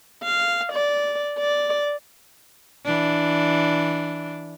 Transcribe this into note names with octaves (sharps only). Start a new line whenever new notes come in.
F5
D5
D5
E3 D4